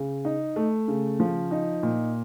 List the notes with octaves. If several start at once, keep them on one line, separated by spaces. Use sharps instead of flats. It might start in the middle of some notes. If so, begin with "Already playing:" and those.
Already playing: C#3
D#4
A3
C#3
F3
D#4
A#2